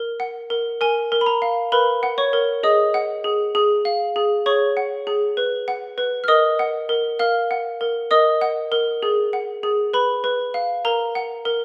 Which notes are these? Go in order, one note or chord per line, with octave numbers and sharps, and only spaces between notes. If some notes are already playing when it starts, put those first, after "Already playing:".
Already playing: A#4
F#5
A#4
A#4 G#5
A#4
B5
A#5
F5
A#4 B4 B5
F#5
C#5 C#6
A#4
G#4 D#5 D#6
F#5
G#4
G#4
F5
G#4
G#4 C#5 C#6
F#5
G#4
B4
F#5
B4
F6
A#4 D#5 D#6
F#5
A#4
A#4 F5 F6
F#5
A#4
A#4 D#5 D#6
F#5
A#4
G#4
F#5
G#4
B4 B5
B4
F5
A#4 A#5
F#5
A#4